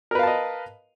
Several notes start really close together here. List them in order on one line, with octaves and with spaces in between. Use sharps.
A#4 B4 F5 A5 D#5